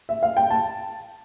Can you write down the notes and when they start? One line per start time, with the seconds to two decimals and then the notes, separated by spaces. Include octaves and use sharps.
0.09 E5
0.23 F5
0.37 G5
0.50 A5